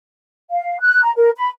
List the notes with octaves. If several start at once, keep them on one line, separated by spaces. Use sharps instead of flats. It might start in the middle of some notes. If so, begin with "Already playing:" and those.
F5
F#6
A#5
A#4
B5